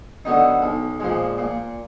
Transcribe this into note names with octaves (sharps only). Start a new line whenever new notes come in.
D3 F#3 B3 D#4
B1
A#2 F3 G#3
A#2